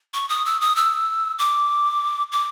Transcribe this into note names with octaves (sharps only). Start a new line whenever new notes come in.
C#6
D#6
E6
D#6
E6
D6
D6